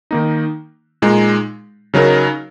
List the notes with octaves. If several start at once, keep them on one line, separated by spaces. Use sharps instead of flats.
D#3 A#3 D#4
A#2 G#3 D#4
C#3 F#3 D#4 A#4